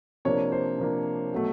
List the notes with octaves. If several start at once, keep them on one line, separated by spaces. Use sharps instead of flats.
C3 F3 A#3 D4 C#5
C5
C3 F3 A#3 D4
B2 F#3 A3